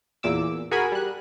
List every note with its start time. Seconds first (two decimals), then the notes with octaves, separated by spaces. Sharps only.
0.23 E2 A#2 D6 E6
0.71 F#4 G#4 A#4 G#5 B5
0.92 G3 F#6